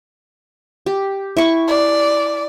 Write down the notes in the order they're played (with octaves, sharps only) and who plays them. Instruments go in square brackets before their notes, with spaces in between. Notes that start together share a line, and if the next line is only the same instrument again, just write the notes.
[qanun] G4
E4 C#6
[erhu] D5